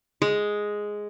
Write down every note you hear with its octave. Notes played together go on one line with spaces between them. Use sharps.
G#3